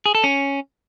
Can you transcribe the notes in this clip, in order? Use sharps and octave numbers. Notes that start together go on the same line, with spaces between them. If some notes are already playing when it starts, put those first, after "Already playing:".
G#4
A4
C#4